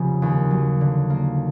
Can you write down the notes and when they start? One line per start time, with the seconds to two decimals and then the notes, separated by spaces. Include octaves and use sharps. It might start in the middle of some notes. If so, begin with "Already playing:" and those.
Already playing: F1 C#3 F3
0.22 D#2
0.51 F#3
0.81 D3
1.10 A#3